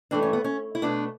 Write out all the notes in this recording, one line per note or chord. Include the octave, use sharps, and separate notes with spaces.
G2 E3 A3 D4
C#4
B3
C#4
E4
B2 A3 B3 D4